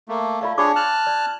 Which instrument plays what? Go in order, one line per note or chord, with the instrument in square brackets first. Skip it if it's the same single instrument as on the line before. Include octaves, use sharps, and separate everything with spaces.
[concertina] A3 A#3
[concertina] A3 [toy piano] F4 D5 F5
[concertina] D4 G#4 C#5 [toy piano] F4 C#6 D6
[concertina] A5 F6 F#6
[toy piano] D5